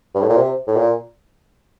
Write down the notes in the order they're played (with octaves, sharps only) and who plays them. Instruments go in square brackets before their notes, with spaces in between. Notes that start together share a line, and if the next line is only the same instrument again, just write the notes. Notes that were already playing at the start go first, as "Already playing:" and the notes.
[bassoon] G2
A2
A#2
C3
A2
A#2